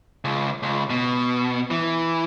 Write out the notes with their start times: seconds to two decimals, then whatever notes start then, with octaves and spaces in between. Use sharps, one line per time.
0.25 C#2
0.63 C#2
0.90 B2
1.71 E3